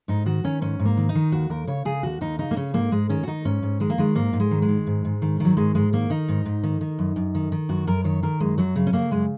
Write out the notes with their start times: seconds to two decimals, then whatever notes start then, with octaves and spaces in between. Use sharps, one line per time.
0.08 G#2 D#4
0.26 D#3 F#4
0.44 D#3 C#4
0.62 G#2 C#4
0.79 G#2
0.85 A#3
0.97 D#3
1.09 D#4
1.15 D#3
1.32 D#2 F#4
1.50 D#2 A#4
1.67 C#3 C#5
1.85 C#3 G#4
2.03 D#2 F#4
2.21 D#2 D#4
2.39 C#3 D#4
2.51 A#3
2.56 C#3 C#4
2.74 G#2 A#3
2.92 G#2 G#3
3.09 D#3 C#4
3.23 F#4
3.27 D#3 D#4
3.45 G#2 C#4
3.62 G#2
3.80 D#3 G#3
3.90 A#3
3.98 D#3 G#3
4.15 G#2 A#3
4.33 G#2
4.40 G#3
4.51 D#3
4.62 G#3
4.69 D#3
4.87 G#2
5.05 G#2
5.22 D#3
5.40 D#3 F#3
5.57 G#2 G#3
5.75 G#2 G#3
5.93 D#3 A#3
6.10 D#3 D#4
6.28 G#2
6.46 G#2
6.63 D#3
6.81 D#3
6.99 F#2
7.16 F#2
7.35 D#3
7.52 D#3
7.69 F#2 F#4
7.87 F#2 A#4
8.04 D#3 C#5
8.23 D#3 A#4
8.40 F#2 G#3
8.58 F#2 F#3
8.76 C#3
8.87 C#4
8.93 C#3 A#3
9.11 F#2 G#3